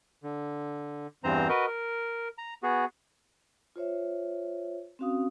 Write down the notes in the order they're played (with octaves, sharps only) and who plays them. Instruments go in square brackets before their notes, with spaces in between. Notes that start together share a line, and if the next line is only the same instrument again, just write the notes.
[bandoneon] D3
E2 G2 E3 C4 C5 A#5
F#4 A#4 B4 D#5
A#4
A#5
B3 F#4 G#4
[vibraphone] F4 C5 C#5 E5
C4 C#4 F#4 F5 D#6